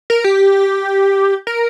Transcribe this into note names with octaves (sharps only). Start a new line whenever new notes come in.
A#4
G4
A#4